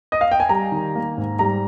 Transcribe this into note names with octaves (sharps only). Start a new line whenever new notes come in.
D#5
F5
G5
G#5
G3 A#5
D#3
A#3
G#2
G3 A#5